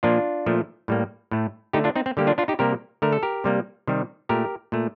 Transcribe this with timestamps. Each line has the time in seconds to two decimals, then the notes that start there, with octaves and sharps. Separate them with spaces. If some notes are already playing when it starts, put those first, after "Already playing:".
0.03 A#2 F3 A#3 D4 F4
0.46 A#2 F3 A3
0.88 A2 G3 A#3
1.31 A2 A3
1.73 D3 A3 D#4 G4
1.84 D4 F4
1.96 C4 D#4
2.06 C4
2.17 D3 G3 A#3 G4
2.27 D4 F4
2.38 D4 F4
2.48 D#4 G4
2.59 C3 G3 A#3 G4 A#4
3.02 D3 A3 A#4
3.12 A4
3.23 G4 A#4
3.44 C3 G3 A#3
3.87 C3 D#3 G3
4.29 A#2 A3 G4 A#4
4.72 A#2 A3